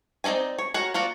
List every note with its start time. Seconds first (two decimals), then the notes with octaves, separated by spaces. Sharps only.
0.24 C4 D#4 E4 D5 G#5
0.59 C#5
0.74 F#4 A#4 C#5
0.94 A#3 F4 F#4 D5